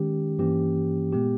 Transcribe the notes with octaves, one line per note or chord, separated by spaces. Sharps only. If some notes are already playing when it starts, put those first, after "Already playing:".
Already playing: D#3 G#3 C#4 G4
G2 E3 A#3 C#4 G4
A#2 G#3 B3 G4